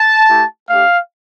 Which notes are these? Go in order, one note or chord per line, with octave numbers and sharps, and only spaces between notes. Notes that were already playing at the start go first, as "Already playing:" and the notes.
Already playing: A5
A3 E4 G4
A3 D4 G4 F5